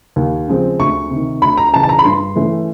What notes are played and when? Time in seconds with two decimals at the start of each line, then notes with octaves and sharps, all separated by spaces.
0.16 D#2
0.48 C#3 F3 G#3 C4
0.79 D2 C#6
1.10 C3
1.15 D#3
1.42 D2 B5
1.57 A#5
1.73 C#3 E3 A5
1.83 A5
1.89 A#5
1.99 B5
2.04 G2 C6
2.36 E3 A3 C#4